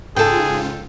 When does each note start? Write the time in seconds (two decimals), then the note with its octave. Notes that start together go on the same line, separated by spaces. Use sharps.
0.16 G#2 C#3 F4 G#4 A4 G5